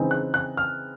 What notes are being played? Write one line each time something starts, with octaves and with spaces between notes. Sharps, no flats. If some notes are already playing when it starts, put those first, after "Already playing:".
Already playing: C#3 E3 G#3 C4 D#4
F#6
F#6
F6